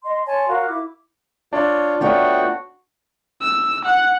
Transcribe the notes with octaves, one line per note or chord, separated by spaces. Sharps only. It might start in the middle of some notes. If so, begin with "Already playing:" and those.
D#5 C6
C#5 G#5 A5 C6
F#4 A#4 F5
E4 D6
D4 F4 C#5
A3 B3 F4 F#4 C#5 D5 G5
E6
F#5